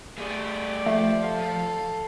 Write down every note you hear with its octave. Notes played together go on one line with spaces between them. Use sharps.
A3 G4 G#4 D5
F3 A3
A4 F5